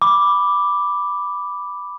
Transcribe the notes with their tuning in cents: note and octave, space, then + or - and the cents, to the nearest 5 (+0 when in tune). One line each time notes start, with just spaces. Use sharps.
B5 +0 D6 +0